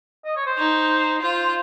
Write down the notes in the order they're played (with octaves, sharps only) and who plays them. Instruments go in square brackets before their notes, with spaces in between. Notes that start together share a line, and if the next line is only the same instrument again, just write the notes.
[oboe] D#5
C#5
C5
[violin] D#4
[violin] F4 [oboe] C5